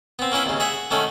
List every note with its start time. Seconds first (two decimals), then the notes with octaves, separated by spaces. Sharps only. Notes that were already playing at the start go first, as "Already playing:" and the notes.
0.19 B3 C4
0.32 A#3 C#4 E4 B4
0.46 D#2 C#3
0.60 G#4 E5 F#5
0.91 D#3 A3 C#4 F#4